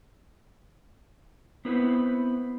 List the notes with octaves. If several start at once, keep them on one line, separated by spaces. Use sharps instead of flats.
B3 C4 E4 B4 C5